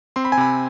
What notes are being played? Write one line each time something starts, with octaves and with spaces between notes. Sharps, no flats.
C4 C6
B5
G#5
C3 B5